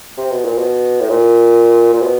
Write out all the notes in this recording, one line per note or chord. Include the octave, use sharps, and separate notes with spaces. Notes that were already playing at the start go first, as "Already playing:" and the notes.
C3
B2
A#2
B2
A2
A#2
A#2
B2